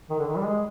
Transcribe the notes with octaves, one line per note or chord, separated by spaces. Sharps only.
D#3
D3
D#3
G3
G#3